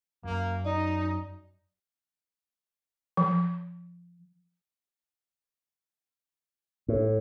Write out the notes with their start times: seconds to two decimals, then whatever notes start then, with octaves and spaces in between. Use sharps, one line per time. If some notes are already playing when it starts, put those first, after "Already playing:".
0.24 F#2 A#3
0.65 D#4 D5 D#5
3.17 F3
6.88 A2